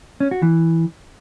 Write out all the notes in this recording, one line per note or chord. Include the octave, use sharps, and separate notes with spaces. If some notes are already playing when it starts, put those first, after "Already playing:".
C#4
F#4
E3